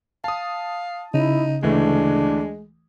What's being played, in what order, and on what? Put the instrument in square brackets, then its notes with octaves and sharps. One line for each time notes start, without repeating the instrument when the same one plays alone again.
[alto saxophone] F5 [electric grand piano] A5 D#6
[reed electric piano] C#3 [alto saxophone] D#4 [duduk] E4
[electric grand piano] D2 E3 A3 [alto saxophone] G#3 [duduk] D4